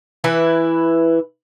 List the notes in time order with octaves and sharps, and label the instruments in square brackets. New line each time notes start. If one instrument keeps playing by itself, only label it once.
[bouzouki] E3 E4 B4